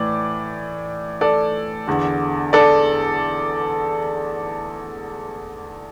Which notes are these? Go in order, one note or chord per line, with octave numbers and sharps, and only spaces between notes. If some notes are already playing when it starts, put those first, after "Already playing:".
Already playing: A2 E3 D5
A4 D5
E2 D3
A4 D5